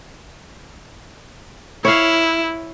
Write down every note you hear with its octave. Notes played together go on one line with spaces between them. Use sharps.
E4 C#5 F5